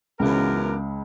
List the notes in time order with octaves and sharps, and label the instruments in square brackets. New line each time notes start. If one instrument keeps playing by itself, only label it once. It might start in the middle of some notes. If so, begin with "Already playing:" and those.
[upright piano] C#2 C#3 [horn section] F#2 E3 B3 D4 A#4